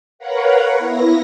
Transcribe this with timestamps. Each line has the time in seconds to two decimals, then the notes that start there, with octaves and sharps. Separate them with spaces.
0.19 A#4 B4 C#5 F5 F#5
0.78 B3 E4 A#6